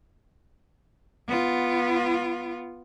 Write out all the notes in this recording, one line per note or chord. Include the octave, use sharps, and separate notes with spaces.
B3 F4